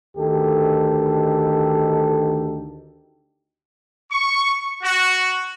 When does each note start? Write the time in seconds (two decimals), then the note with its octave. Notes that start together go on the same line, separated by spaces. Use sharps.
0.17 D2 D#3 D#4 G4 A4
4.09 C#6
4.82 F#4